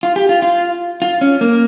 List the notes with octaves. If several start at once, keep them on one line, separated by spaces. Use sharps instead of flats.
F4
G4
F4
F4
F4
C#4
A#3